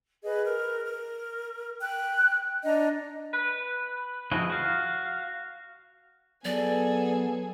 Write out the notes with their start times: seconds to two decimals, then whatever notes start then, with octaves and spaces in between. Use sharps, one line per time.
0.23 G#4 B4 D#5
0.44 A#4
0.84 A#4
1.79 G5 F#6
2.64 D4 D#5 A#5
3.33 B4
4.31 F3 E4 F#4 G#4 D#5
4.50 F#4 F5
6.45 F#3 B3 G#4 A4 D5